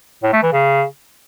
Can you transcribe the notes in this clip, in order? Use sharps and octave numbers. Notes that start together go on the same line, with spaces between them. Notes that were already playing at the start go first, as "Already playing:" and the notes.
A2
A3
E3
C#3